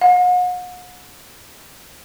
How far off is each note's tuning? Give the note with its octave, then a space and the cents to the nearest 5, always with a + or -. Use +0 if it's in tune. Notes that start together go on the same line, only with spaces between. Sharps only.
F#5 -40